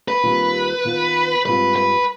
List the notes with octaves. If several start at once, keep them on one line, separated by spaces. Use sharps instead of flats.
B4
D#2 D#3 G3 C4 F4
D#3 B3 F4
G#2 G3 C4 F4 B4
B4